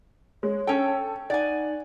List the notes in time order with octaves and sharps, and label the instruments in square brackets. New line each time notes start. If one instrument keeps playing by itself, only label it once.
[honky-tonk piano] G#3 [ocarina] C#5
[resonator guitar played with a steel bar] C#4 G5 [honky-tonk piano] A4
[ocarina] D#4 [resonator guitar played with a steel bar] D5 G#5 [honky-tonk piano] F#5